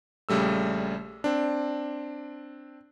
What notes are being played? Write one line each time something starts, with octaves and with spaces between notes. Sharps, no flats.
A#1 C#3 G3 A3 E6
C4 D4